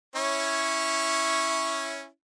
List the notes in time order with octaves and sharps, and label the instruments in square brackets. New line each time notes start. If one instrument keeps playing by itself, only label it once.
[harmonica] C#4 E4 C#5